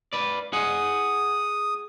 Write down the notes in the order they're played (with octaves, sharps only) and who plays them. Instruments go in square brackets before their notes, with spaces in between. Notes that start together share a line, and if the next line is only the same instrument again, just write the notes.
[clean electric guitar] B4 D5
[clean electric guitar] G#4 F#5 [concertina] D#6